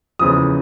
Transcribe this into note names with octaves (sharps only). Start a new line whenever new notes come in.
F#1 E2 C#3 F3 D#6